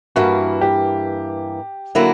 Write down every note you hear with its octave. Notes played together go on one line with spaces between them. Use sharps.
G2 E3 A#3 F#4
G4
D3 F#3 A#3 E4